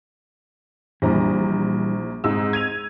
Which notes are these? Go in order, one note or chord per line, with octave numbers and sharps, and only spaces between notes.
A#1 E3 G3 C5 A#5
G#2 C4 E6
G#6 D#7 F7